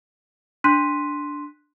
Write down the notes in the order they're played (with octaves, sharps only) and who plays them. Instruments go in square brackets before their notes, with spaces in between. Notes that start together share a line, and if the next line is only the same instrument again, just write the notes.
[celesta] D4 C6 F#6 B6 D#7